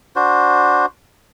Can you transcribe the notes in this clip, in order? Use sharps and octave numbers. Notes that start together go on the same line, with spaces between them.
D4 F#4 C5